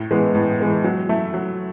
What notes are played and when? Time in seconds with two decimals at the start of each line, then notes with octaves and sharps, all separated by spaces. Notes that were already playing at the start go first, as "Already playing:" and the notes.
Already playing: A2
0.11 E3 G#3 B3
0.35 A2
0.60 E3 G#3 B3
0.84 F#3
1.09 A3 E4
1.34 F#3